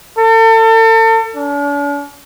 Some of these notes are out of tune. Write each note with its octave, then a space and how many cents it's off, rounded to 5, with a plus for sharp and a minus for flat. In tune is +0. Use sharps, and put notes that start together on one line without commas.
A4 +35
D4 -45